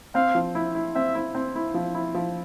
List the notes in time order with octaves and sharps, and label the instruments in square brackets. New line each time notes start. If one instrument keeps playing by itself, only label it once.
[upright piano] C4 [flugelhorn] F5
[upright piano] F3
E4
E4
[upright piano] C4 [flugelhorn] E5
[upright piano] E4
C4
E4
F3
E4
F3